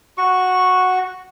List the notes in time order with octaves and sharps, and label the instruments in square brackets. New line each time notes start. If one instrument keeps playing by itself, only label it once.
[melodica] F#4 C#6